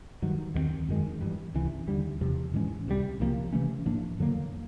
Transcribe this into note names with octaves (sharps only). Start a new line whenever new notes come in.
G2 D#3 F#3
D#2 D#3 G#3 C4
F#2 D#3 G#3
G2 E3 G3
C#2 C3 E3
D#2 D3 G3
E2 C3 F3
A2 E3 G#3 C#4
C#2 C3 D#3 G3
C2 C3 F3 A#3
C3 E3 A3 C#4
A2 F3 A#3 D4
F2 D3 F#3 A#3